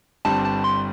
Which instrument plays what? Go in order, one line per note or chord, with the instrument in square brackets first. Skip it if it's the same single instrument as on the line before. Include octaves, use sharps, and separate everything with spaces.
[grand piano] G1 G2 G3 C4 [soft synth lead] A5
[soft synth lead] A5
C6